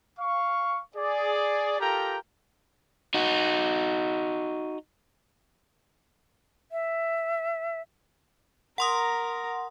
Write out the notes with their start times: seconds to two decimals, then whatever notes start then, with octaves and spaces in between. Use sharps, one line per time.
0.19 F5 C#6
0.96 G#4 D5
1.80 F4 G4 A4 A#4 G5 A#5
3.14 D#4 F#4
6.72 E5
8.78 A#4 F#5 A#5 C6 D#6